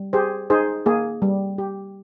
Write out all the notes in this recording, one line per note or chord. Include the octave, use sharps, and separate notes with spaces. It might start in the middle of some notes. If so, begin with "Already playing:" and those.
Already playing: G3
G4 G#4 C5
D#4 G#4 C5
A#3 G#4
G3
G4